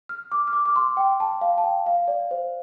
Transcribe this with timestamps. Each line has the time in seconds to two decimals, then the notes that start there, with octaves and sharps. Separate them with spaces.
0.09 F6
0.32 D6
0.47 F6
0.53 D6
0.66 D6
0.76 C6
0.97 G5
1.20 A5
1.41 F5
1.58 A5
1.64 G5
1.86 F5
2.08 D5
2.31 C5